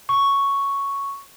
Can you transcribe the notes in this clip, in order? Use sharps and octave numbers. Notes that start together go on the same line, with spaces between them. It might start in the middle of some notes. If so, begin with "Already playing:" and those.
C#6